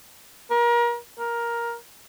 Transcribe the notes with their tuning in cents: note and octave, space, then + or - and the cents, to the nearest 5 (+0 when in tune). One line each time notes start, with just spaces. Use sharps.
A#4 +30
A#4 +10